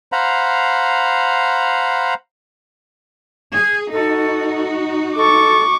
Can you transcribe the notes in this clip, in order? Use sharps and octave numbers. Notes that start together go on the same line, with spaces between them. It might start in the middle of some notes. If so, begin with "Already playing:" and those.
C5 F5 F#5 A#5 B5
G#4 G#6
D#4 F#4 A4
A4 C#6 D6